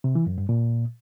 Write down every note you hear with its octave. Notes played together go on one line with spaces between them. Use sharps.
C3
E3
F#2
G2
A#2